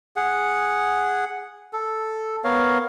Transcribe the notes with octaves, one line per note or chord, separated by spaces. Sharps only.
G#4 F#5
A4
B3 A#4 C#5 F5